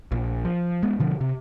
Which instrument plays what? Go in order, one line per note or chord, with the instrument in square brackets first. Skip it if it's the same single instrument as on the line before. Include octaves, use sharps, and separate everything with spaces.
[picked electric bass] A#1
F3
G#3 B3
B2 D3 F3
C3